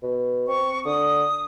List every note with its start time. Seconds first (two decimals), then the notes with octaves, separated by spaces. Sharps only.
0.03 B2
0.48 C4 C#6
0.85 D3 D#6